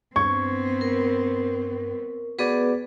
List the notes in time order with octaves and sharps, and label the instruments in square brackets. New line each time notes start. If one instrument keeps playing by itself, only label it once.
[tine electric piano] G2 G#6 [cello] B3 C4 [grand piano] C#6
[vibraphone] A#4
[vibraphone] B3 G#4 B4 [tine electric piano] F#4 D5